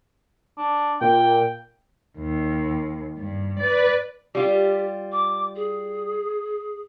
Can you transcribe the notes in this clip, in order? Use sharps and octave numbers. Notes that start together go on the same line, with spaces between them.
D4
A#2 G5
D#2
G2
B4 D5
G3 F4 G4
D6
G#4